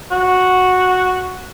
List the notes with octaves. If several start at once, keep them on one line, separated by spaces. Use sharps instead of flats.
F#4